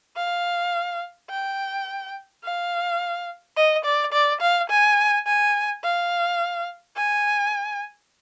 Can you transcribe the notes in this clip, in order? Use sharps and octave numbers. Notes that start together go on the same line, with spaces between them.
F5
G5
F5
D#5
D5
D5
F5
G#5
G#5
F5
G#5